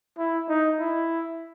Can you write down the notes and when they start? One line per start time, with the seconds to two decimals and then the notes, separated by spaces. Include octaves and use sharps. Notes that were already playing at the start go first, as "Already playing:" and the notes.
0.18 E4
0.49 D#4
0.80 E4